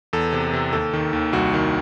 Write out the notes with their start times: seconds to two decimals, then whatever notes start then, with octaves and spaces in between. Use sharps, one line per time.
0.13 E2 A4
0.33 C3
0.53 C3
0.72 D#2 A4
0.94 D#3
1.13 D#2
1.33 C2 F#4
1.54 D#3